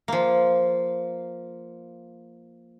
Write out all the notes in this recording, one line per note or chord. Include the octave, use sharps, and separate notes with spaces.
F3 A#3